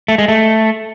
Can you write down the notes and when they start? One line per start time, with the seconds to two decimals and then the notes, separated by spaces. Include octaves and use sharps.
0.08 A3
0.18 G#3
0.28 A3